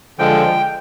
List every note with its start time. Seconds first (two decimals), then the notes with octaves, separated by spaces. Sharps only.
0.18 D3 F3 G#3 G5